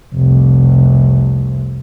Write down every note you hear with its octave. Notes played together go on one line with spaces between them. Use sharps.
F1 C2